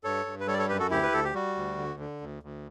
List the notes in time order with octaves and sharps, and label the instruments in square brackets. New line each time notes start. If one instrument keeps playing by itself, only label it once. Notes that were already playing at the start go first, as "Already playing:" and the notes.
[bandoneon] G2 A4 C#5
G2
B4
G3 A4 C#5
D5
A4 C#5
F#2 G4 B4
F#4 A4
D2 E4 G4
B4
D2 A4
G4
G3 F#4
D2
D3
D3
D2
D2